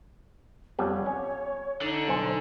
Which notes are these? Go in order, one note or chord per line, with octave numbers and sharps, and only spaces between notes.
F2 G3 B3 C#5
C#4
D3 D#4
B1 C5 G#5